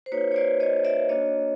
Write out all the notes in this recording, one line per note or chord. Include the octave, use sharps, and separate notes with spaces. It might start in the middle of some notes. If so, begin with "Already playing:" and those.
C5
A#3 D#4 F#4 B4 C#5
C#5
C5 D5
C#5 D#5
D5 E5
A#3 D4 F#4 C#5 D#5